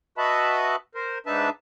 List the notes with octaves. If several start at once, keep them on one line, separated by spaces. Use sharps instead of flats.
F#4 B4 D#5 E5 A5 B5
A#4 C5
G#2 D4 D#4 B4 E5 A5